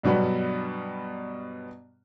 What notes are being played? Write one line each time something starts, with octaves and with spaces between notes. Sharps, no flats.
G2 B2 F#3 G3 B3